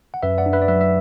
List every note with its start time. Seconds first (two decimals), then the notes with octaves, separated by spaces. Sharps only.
0.14 F#5
0.23 F#2 B4 E5
0.38 D5 F#5
0.46 D4
0.53 B4 E5
0.62 D5
0.68 F#3 B4 E5
0.81 E5